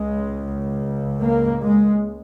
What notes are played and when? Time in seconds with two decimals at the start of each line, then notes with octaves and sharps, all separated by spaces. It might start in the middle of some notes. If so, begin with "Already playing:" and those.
Already playing: C#2 C#3 G#3
1.21 A#3
1.62 G#3